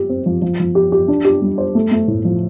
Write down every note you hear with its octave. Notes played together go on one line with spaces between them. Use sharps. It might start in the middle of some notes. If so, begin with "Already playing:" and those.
Already playing: G4
C4
F3
F3
F3
G4
G4
D4
G4
G3
C5
A3
A3
A2
F3